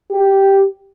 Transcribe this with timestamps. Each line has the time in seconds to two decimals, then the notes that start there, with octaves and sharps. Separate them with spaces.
0.11 G4